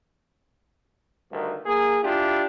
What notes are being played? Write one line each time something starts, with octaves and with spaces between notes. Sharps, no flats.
D2 G2 D#3
A#3 G#4
D4 E4 F4 G4